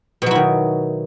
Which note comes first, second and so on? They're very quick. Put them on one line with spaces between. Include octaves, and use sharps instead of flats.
B2 F#3 E4 D#3